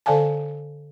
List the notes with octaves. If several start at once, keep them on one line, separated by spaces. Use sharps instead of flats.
D3 A4 D5 F5 G#5 A5